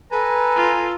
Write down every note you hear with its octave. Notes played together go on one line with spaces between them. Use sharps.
A4 B4 G#5 A#5
F4